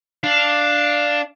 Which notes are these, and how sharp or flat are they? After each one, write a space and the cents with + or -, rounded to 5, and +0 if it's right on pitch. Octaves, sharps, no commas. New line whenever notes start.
D4 +0 F5 +0